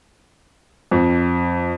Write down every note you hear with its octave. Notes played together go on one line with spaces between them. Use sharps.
F2